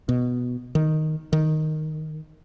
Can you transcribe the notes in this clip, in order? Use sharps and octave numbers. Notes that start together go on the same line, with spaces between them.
B2
D#3
D#3